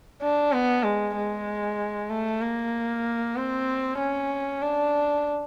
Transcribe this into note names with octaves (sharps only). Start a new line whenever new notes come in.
D4
B3
G#3
G#3
A3
A#3
C4
C#4
D4